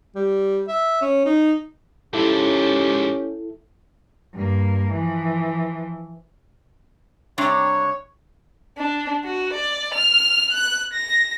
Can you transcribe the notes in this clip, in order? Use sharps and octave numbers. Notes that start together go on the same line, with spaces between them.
G3
E5
C#4
D#4
G#2 F3 C#4 E4 G4 A4
G2 A#3
E3 F3
C3 G3 D4 C#5
D4
F#4
D5
F6
F#6
A#6